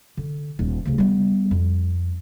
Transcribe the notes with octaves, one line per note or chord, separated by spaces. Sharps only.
D3
D#1 D#4
D2 C#3
G3 B3
F2